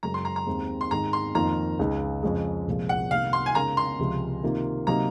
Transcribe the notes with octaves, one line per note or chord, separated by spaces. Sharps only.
F#2 C#3 G#3 A#5
C6
A#5
A#5
D#2 D#3 G#3 C4
C6
G#2 D#3 G#3 A#5
C6
F2 D#3 A#3 F4 A#5
C#2 C#3 G#3 D#4
F2 C#3 G#3
C2 A#2 F3 G#3
F#5
C2 C3 D#3 A#3 F5
C6
G#5
C#3 G#3 D#4 A#4 A#5
C6
C#2 C3 F3 G#3
C3 D#3 A#3 F4
C3 F#3 A#3 D#4 A#4 A#5